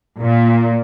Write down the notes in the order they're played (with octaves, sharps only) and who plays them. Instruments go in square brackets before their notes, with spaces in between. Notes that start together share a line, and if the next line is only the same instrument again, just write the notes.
[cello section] A#2